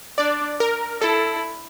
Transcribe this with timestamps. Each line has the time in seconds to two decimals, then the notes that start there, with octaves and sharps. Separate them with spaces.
0.18 D4 D5
0.60 A#4
1.01 E4 A4